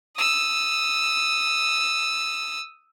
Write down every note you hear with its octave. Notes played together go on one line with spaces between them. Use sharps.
D#6 E6